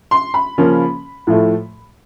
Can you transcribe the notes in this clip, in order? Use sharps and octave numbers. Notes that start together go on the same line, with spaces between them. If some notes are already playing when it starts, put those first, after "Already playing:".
C6
B5
C#3 F3 A#3 C#4
A2 F3 A3